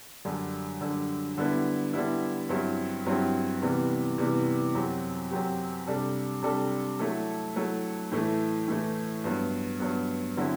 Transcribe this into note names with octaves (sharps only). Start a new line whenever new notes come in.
F#2 D3 G3
F#2 D3 G3
D3 G3 B3 E4
D3 G3 B3 E4
G2 F#3 C4 E4 G4
G2 F#3 C4 E4 G4
C3 E3 G3 B3
C3 E3 G3 B3
F#2 F#3 C4 G4
F#2 F#3 C4 G4
C3 G3 D4 A4
C3 G3 D4 A4
F#3 A3 E4 A4
F#3 A3 E4 A4
A2 E3 A3 E4
A2 E3 A3 E4
G2 F#3 B3
G2 F#3 B3
D3 F#3 C4 E4